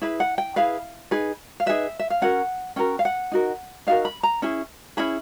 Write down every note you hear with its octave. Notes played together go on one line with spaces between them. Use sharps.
E4 G#4 B4
F#5
G5
E4 G#4 B4 F5
D#4 G#4 B4
F5
D#4 G#4 B4 E5
E5
F5
C#4 F#4 A#4 F#5
C#4 F#4 A#4 G5
F5
F#5
D#4 F#4 A#4
D#4 F#4 A#4 F5
B5
A#5
C#4 E4 G#4
C#4 E4 G#4 B5